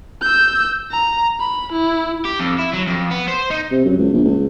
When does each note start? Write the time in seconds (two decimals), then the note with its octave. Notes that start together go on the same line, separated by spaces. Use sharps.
0.22 E6 G6
0.91 A#5
1.40 B5
1.72 E4
2.25 G4
2.40 F2
2.59 E4
2.74 F#3
2.87 F2
3.11 B3
3.28 C5
3.50 D#4
3.71 C3
3.85 F#2
3.98 C#2
4.13 A#1
4.24 C#2